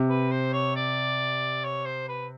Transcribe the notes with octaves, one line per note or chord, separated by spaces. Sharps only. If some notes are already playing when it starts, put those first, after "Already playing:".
Already playing: C3
B4
C5
C#5
D5
C#5
C5
B4